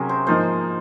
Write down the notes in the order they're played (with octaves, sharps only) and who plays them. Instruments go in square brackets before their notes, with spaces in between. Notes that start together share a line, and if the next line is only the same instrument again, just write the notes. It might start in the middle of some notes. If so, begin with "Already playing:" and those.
Already playing: [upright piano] C3 F#3 C#4 F#4 [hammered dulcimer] G#4 A#4
[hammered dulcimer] C5
[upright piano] G#2 F3 A#3 [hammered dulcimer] C5